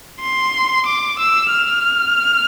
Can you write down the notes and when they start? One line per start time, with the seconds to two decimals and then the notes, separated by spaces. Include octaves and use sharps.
0.21 C6
0.86 D6
1.19 E6
1.51 F6